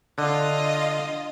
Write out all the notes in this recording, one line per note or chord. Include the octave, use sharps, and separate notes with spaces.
D3 F4 D#5